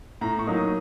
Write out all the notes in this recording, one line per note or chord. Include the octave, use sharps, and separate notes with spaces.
A2 A#5
C#6
F#3 A#3 D#4
D#6